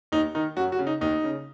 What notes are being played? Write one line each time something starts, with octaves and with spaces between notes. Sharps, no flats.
D#2 D#4
D#3 D#4
F#2 F#4
F#4
C#3
D#4
D#2 D#4
C#3